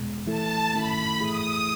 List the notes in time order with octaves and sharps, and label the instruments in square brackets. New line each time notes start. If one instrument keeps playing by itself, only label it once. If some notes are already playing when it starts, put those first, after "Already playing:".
Already playing: [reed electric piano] E2 B2 G#3
[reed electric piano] E3 A3 E4 A4 [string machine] A5
[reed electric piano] D#3 A3 C#4 E4 A4 [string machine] B5
[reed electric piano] A2 E3 A3 E4 G#4 [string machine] D#6